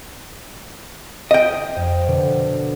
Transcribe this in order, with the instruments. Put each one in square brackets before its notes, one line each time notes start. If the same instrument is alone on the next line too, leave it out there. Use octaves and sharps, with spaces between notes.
[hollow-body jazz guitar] D#5 G5
[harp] F2
B2 D3